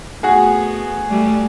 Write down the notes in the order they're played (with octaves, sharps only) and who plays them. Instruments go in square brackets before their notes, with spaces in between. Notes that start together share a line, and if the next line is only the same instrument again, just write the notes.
[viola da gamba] A3 B3 [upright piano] F#4 G#4
[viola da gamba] G3 A3